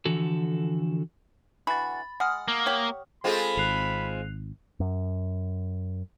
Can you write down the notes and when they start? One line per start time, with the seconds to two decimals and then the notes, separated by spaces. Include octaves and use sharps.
0.05 D3 E3 F3 F#4 A4
1.67 D3 E3 F#4 B5 A6
2.20 G#3 F#5 D#6 F6
2.48 A#3
2.66 G4 C#5
3.24 G#3 C4 F4 G#4 A4 B5
3.57 G#1 F#6 C7 F7
4.80 F#2